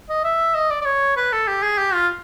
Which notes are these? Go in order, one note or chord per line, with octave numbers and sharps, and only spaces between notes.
D#5
E5
D#5
D5
D5
C#5
B4
A4
G4
G#4
G4
F4